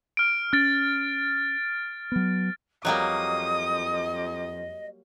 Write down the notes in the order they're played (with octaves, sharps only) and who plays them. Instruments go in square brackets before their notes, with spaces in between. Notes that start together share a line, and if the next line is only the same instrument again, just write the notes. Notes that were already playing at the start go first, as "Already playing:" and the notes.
[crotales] F6 D7
[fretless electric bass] C#4 [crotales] F6 A6 D7
[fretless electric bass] F#3 B3
[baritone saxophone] F2 [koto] F#3 G3 A#3 [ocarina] D#5 [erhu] D#6